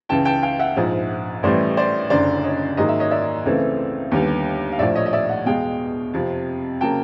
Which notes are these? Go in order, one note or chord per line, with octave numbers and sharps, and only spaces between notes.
C#2 C#3 E3 G5 A5
G5 A5
F5 G5
E5 F#5
A#1 G#2 F3
A1 A2 E3 G3 C5 D5
C5 D5
F#1 F#2 D3 C5 D5
C#5 D#5
G#2 D#3 F#3 A#3 D#5
E5
C#5 D#5
D5 E5
C#2 C#3 E3 A3 C4
D#2 D3 G3 B3
F5
A#1 A2 F3 D5 E5
C#5 D#5
D#5
D5 E5
E5 F#5
E2 B2 G#3 F5 G5
F2 C3 F3
C#3 F#3 A#3 G5 A5